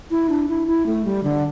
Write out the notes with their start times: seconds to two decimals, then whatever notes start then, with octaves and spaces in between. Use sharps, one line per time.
0.11 E4
0.30 D4
0.49 E4
0.68 E4
0.86 A3
1.05 G3
1.24 D3